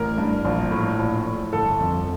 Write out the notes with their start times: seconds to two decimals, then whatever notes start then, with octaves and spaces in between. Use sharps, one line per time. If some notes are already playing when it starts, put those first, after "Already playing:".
Already playing: A1 A#4
0.18 G2
0.45 A#1
0.71 A2
0.99 A#1
1.26 A2
1.53 G1 A4
1.80 F2